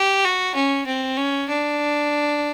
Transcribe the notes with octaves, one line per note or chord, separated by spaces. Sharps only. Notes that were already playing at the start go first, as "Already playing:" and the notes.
Already playing: G4
F#4
C#4
C4
C#4
D4